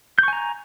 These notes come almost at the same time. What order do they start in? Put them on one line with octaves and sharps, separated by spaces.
G6 C#6 G#5 A#5